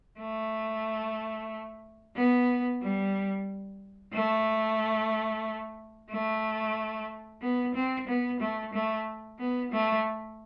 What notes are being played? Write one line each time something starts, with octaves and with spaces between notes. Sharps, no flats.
A3
B3
G3
A3
A3
B3
C4
B3
A3
A3
B3
A3